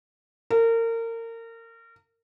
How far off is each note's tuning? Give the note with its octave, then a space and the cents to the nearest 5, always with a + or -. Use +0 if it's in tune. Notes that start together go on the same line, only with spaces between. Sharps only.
A#4 -30